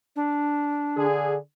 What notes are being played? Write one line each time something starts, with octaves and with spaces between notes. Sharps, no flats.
D4
D3 G#4